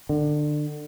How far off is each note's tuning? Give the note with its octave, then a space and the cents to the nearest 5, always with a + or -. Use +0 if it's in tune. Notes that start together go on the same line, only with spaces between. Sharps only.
D3 +25